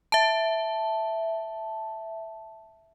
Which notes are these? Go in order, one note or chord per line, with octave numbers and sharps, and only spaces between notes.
E5 A5